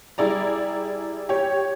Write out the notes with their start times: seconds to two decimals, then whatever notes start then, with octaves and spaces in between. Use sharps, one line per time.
0.18 G3 E4 G#4 D5 A#5
1.29 G4 C#5